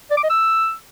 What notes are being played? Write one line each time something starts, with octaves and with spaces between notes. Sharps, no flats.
D5
D6
D#5
E6